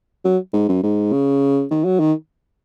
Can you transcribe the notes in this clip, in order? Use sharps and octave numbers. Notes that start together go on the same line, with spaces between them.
F#3
G#2
F#2
G#2
C#3
D#3
F#3
D#3